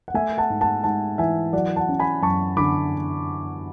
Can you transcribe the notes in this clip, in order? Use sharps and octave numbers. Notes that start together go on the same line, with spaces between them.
F#5
A3 E5 G#5
F#5 A5
G#2
F#5 A5
G#2 F#5 A5
E3 E5 G#5
F#3 D5 F#5
F#5 A5
C#4
G#5 B5
F#2 A5 C#6
D3 B5 D6